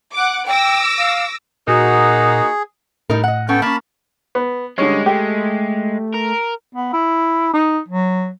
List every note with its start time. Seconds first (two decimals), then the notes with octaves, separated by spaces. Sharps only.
0.14 F#5 D6
0.47 G5 D6 E6 A#6
0.98 F5
1.68 A#2 A#3 D#4 F#4 G#4
3.10 A2 G3 D#4 A#4
3.24 D#5 F#5
3.49 B3 C#4 A4 G5
3.62 A#3 C#4 A5 B5
4.35 B3
4.78 D3 G3 G#3 C#4
5.06 A3 G4
6.14 A#4
6.75 B3
6.93 E4
7.54 D#4
7.88 F#3